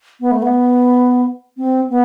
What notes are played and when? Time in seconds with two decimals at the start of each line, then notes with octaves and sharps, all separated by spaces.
0.20 B3
0.31 A3
0.42 B3
1.57 C4
1.90 B3